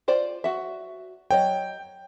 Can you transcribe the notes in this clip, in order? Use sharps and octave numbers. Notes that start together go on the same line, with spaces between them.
F4 C5 D5
F#4 E5
F#3 C#5 D#5 G5